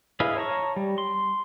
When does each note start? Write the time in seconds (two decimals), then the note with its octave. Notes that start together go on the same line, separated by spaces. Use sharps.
0.20 E4 G#4 B4 D#5 F5
0.37 C#5 A5 A#5 C#6
0.76 G3
0.98 C6